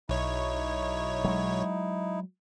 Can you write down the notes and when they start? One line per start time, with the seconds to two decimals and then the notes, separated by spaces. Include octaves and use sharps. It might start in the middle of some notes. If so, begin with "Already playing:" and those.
0.09 B1 D#4 E4 C#5
1.25 F#3 G#3